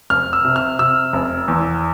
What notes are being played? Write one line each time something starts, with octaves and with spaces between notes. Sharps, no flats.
F1 F6
E6
C3
F6
C3 E6
F1
E2